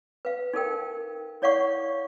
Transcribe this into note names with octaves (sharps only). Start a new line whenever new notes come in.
B4 F5
D#4 A4 A#4 G5
E4 C#5 D5 F5 F#5 C#6